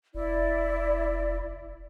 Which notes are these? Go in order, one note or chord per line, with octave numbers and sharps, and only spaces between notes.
F1 E4 D5